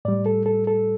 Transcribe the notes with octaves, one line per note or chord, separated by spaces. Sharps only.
A2 G3 D5
A4
A4
A4